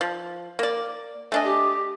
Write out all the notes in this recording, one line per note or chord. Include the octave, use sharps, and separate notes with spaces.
F3
A#3 D5
A3 D4 D#5 G#5
G4